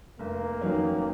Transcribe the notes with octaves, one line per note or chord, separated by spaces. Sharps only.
F1 A#3
F2 D#3 F#3 C#4